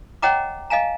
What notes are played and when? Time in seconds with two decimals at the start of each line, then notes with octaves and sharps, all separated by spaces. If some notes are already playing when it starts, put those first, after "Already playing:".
0.22 C#5 D#5 F#5 G5 A#5 D6
0.70 D#5 F5 G#5 A#5